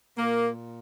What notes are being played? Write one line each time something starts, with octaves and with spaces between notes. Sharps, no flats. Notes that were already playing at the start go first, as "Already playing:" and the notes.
A#2 A#3